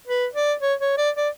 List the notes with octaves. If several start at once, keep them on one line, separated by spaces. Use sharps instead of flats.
B4
D5
C#5
C#5
D5
D5